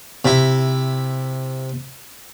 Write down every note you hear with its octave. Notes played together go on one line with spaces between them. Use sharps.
C3 E4